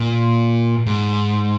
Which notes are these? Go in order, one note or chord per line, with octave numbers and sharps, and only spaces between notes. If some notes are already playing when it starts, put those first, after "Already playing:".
Already playing: A#2
G#2